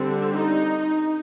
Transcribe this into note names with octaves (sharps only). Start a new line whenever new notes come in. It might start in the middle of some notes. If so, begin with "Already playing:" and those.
Already playing: D3 G3 C4
D#4